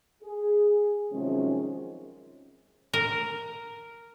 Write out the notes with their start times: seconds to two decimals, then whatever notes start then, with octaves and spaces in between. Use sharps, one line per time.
0.23 G#4
1.12 C3 D#3 F3 F#3 G#3 C#4
2.94 A#4